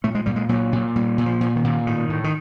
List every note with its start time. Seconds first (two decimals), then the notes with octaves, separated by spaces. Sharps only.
0.04 A#2 A3
0.15 G#3
0.26 A#2 G3
0.36 G#3
0.49 A#2 F#3
0.72 A#2
0.96 A#2 G3
1.18 A#2
1.26 F3
1.41 A#2
1.56 D#3
1.64 A#2
1.87 A2 D#3
2.10 A2
2.24 D#3